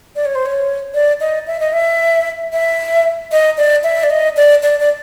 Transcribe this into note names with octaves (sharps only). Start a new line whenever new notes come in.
D5
C#5
C5
C#5
D5
D#5
E5
D#5
E5
E5
D#5
D5
E5
D5
D#5
D5
D5
D5